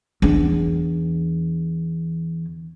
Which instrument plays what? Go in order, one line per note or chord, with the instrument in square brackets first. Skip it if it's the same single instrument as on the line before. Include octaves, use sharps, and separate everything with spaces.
[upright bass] E2 D4